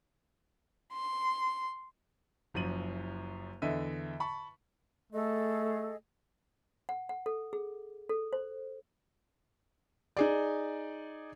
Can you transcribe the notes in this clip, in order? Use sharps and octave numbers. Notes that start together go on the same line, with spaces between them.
C6
F#1 F#2 F3 D#7 F#7
E2 D3 D#5 E5 D#7
A5 B5 C#6
A3 G#4 A4 D#5
F#5
F#5
A4
G#4
A4
C5
D#4 G#4 D5